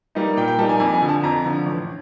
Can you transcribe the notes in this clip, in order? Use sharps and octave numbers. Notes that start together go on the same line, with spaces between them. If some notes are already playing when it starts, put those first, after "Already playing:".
G3 A#3 D#4
A#2 G5
G5
G3 A#3 D#4 A5
G#5
F2 G#5
G#5
D3 F3
A5
F2 A#5
D3 F3
A1